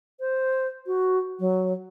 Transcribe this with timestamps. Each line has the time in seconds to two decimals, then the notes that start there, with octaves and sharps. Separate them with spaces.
0.20 C5
0.87 F#4
1.40 F#3